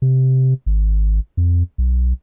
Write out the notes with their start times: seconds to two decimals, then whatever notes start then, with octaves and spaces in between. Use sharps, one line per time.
0.02 C3
0.66 G#1
1.37 F2
1.78 B1